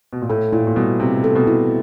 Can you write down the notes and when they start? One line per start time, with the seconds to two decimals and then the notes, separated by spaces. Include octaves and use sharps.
0.13 B2
0.22 A#2
0.29 A2 A4
0.53 A#2 E4
0.67 A#2
0.76 B2 G3
1.00 C3 C4
1.24 A4
1.36 B2
1.47 E4